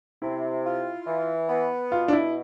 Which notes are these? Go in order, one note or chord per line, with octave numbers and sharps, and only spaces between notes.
C3 E4
F4
E3
B3
B2 F4
D4
E4